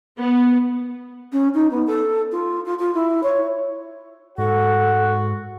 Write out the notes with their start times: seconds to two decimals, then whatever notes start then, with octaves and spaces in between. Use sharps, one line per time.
0.20 B3
1.33 C#4
1.55 D#4
1.71 B3
1.87 A4
2.32 F4
2.66 F4
2.79 F4
2.94 E4
3.23 C#5
4.38 G#2 F#4 A4 F#5